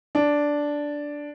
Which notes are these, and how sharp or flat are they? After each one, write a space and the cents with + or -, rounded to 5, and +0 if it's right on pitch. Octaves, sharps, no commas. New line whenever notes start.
D4 -5